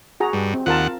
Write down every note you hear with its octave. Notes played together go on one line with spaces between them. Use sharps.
F#4 G#4 A#5
G2
C4
D#2 F4 A#4 F#5 A5